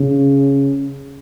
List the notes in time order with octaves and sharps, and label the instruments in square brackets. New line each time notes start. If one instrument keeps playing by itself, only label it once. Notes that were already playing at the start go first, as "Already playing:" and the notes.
Already playing: [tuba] C#3